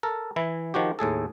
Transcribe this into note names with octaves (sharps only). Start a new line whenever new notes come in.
A4 A#4
E3 E4
D#3 F3 F#4 G4
D#2 A2 G#4 A4